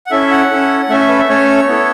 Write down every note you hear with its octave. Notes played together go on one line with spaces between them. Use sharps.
F#5
C#4 E4 A4 E5
F#5
C#4 E4 A4
A3 C#4 A4 E5
E5
B4
E5
A3 C#4 A4 C#5
B3 E4 A4